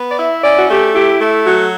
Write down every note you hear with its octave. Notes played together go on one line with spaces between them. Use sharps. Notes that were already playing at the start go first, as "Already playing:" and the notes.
Already playing: B3
D5
E4 E5
C#4 D5
F#4
A3 G4
E4 G4
A3
F#3 F#4